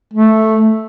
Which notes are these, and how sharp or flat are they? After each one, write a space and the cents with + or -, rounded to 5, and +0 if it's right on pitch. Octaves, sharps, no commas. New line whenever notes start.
A3 +0